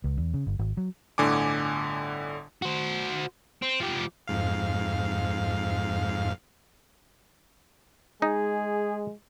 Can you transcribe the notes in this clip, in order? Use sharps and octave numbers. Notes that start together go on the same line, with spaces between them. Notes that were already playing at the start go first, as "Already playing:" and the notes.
C#2
E2
C#3
G1
G#1
F#3
G1 A2 D3 G#5 D6
F#4 C5
C4
F3 G4
F2 G#2 F5
G#3 D#4 G#4